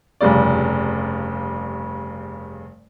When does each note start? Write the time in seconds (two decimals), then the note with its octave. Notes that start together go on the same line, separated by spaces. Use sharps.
0.21 F1 G2 C#3 D5